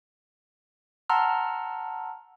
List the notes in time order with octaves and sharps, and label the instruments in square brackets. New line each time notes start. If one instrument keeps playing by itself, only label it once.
[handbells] F#5 A5 A#5 C6 E6 F6